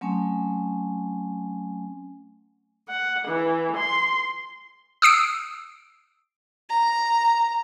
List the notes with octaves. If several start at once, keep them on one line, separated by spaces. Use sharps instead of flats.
F#3 A3 C4 C#4 G#5
F#5
E3
C6
D#6 E6 C7 D7
A#5